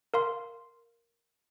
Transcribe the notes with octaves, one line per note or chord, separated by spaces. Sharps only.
A#4 F5 C6